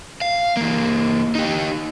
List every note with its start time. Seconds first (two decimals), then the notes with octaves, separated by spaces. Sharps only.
0.21 F5
0.57 E3 A#3
1.35 D#4 G4